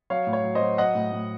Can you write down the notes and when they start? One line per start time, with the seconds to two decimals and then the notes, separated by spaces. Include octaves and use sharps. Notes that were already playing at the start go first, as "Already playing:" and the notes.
0.10 F#3 C#5 F5
0.27 A2
0.33 C#5
0.44 F#3
0.55 C5 D#5
0.61 F#3
0.78 F#3 D#5 F#5
0.95 A2
1.12 A2